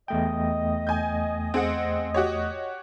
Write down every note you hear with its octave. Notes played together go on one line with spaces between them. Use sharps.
E2 A3 D#5 G5
G#5 G6
C4 G#4 F#5
F#4 G4 C#5